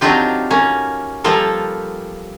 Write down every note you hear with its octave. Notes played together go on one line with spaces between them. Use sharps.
F#3 C4 D4 D#4 F4 G4
A#3 C#4
F3 G3 A#3 F4 A4